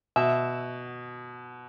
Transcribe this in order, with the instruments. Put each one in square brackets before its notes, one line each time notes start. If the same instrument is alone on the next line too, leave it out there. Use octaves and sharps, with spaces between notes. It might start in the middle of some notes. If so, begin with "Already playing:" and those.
[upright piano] B2 [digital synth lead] E5